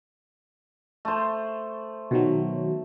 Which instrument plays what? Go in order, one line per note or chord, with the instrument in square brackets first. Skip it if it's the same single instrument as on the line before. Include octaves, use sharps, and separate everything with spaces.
[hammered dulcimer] A3 C5
[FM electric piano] B2 D#3 F#3